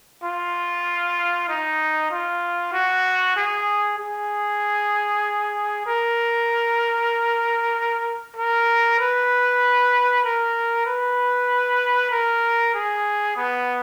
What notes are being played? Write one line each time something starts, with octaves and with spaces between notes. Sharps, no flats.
F4
D#4
F4
F#4
G#4
G#4
A#4
A#4
B4
A#4
B4
A#4
G#4
B3